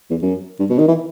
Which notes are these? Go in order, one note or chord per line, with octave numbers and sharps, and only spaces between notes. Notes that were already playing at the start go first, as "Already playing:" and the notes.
E2
F#2
G2
B2
D#3
E3